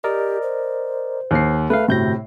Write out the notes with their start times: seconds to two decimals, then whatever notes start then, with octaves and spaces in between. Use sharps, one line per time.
0.04 G4 A#4 D5 D#5
0.42 C5
1.31 D#2 C7
1.70 A3 B4 E5 F5
1.88 G1 A2 C3 F#4 G6 A#6